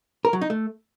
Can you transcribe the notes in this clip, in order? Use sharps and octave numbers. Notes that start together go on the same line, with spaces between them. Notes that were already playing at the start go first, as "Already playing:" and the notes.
A#4
F#3
D#4
A3